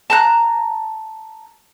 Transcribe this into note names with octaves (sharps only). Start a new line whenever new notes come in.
A5 A#5 F#6